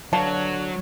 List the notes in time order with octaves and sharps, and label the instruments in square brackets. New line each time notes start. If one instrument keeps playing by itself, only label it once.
[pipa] B2 F5 A5 [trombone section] D3 D4 [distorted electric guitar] F#3 [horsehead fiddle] C#5